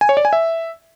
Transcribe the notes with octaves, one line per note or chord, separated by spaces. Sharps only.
G#5
C#5
D5
G#5
E5